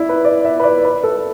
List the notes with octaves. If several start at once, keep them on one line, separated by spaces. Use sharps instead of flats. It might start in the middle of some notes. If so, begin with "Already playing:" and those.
Already playing: E4 D5
B4
D5
E5
B4
D5
B4
A4